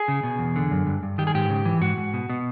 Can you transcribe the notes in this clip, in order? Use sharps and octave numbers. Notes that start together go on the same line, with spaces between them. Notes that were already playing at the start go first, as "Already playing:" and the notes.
Already playing: G#4
C#3
B2
E2
D3
F#2
G2
G2
D#3 G4
G#4
G#2 G4
C#3
E3
G#2 F#4
G#2
B2
B2